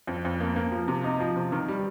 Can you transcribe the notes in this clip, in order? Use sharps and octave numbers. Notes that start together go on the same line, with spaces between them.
F2
F2
A#3
A#3
F3
C3
D#4
F3
C3
D#3
G3